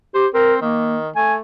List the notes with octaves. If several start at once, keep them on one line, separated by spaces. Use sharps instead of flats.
G4 C5
C4 A#4
D#3 A#3
A3 G#5